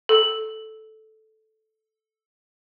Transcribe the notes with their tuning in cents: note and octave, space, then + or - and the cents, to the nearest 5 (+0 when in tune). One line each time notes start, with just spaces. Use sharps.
A4 -10